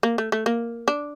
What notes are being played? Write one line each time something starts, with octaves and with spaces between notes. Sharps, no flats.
A#3
A3
A3
A#3
D4